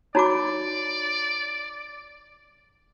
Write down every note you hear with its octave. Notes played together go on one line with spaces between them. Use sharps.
D#4 F#4 C#5 D5 A#5 B5 D6